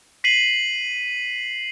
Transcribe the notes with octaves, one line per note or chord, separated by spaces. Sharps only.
B6 C7 D#7 F#7